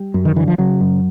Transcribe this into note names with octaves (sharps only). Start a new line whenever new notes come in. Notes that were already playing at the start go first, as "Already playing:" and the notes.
Already playing: G3
F#2
D#3
D3 E3
F3
C#3 F#3
F#2